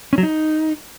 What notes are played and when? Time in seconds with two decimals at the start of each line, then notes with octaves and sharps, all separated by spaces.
0.13 C#4
0.18 F#3
0.23 D#4